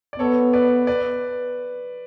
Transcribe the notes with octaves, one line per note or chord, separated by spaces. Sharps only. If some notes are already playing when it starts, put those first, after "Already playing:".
D5
B3 A4 C#5
B4 D5
B4 D5